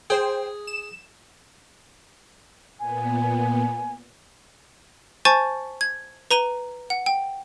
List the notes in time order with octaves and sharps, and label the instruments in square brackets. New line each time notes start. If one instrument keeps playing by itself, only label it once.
[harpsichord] G#4 [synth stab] C5 G5
[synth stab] E7
[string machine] A#2 B3 [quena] G#5
[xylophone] C5 G#5 A5 C#6 A6
G#6
B4 A#5 D#7 G7
F#5
G5